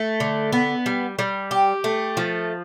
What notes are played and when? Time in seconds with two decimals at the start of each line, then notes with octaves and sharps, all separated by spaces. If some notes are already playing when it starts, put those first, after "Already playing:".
Already playing: A3
0.20 D3
0.52 B3
0.86 G3
1.19 G3
1.51 G4
1.84 A3
2.17 F3